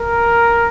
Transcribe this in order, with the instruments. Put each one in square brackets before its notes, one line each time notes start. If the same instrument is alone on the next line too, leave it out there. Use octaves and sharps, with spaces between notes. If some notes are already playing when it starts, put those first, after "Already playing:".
Already playing: [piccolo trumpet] A#4